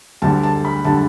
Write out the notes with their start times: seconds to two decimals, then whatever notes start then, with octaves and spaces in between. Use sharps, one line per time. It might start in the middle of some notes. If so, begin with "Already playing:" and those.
0.22 D2 D3 G3 A5
0.43 A5
0.65 B5
0.85 D3 G3 A5